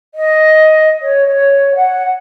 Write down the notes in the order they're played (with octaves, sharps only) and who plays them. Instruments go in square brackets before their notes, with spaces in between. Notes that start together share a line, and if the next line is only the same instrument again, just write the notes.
[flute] D#5
C#5
C#5
F#5